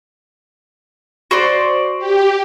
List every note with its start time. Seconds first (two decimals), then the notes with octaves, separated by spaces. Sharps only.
1.31 F#4 C5 D5
1.98 G4